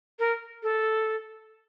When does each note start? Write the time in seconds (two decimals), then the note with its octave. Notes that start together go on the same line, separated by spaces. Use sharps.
0.19 A#4
0.63 A4